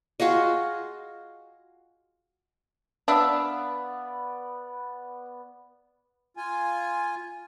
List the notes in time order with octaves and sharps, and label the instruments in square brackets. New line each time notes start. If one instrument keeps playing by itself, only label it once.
[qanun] F4 F#4 G#4 D#5
[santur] B3 D5 [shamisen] D4 [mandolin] E5 F5 E6
[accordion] F4 G#5